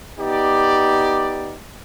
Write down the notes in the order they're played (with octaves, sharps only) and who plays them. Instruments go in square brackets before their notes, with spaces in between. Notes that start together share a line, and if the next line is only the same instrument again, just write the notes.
[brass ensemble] B3 D#4 G4 D5